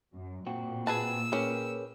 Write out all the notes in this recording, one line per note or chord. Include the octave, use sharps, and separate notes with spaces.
F#2
A#2 C4 F#4
G#4 B4 A5 E6
C#4 G4 G#4 A#4 B4